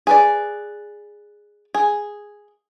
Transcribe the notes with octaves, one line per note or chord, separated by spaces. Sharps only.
G#4 B4 D5
G#4